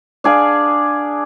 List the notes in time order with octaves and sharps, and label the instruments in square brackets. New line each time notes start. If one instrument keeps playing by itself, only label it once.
[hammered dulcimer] D4 G#4 D5 F5